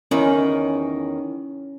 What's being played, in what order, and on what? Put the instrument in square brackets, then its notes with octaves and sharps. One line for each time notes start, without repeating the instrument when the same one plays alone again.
[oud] E2 D#3 [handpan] C#4